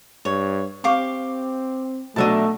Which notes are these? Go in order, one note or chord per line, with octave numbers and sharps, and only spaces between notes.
G2 C#5
C4 G4 F5 C#6 D6
B2 F#3 A3 D4 D#5 E5 A5